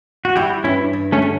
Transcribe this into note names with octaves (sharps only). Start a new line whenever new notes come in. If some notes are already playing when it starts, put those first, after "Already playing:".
F#4
G3 E4 G4
G2 C#4 E4
G2
A3 C#4
D3